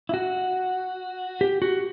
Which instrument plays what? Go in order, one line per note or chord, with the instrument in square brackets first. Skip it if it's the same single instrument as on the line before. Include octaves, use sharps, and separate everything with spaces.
[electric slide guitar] E4
F#4
G4
F#4